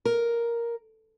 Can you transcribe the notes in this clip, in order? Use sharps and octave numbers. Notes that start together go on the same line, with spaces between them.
A#4